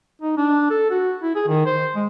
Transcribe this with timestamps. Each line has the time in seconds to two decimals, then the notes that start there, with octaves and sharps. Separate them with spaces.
0.21 D#4
0.37 D4
0.70 A4
0.90 F#4
1.22 E4
1.35 G#4
1.47 D#3
1.66 C5
1.96 G#3